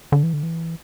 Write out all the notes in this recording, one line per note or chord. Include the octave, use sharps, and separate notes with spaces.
D3
E3
D3
E3